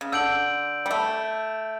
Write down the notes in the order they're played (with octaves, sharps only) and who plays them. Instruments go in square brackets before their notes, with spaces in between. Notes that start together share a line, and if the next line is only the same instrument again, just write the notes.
[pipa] C#3
[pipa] D3 [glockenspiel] E6 G6 D7 F#7
[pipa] G3
A3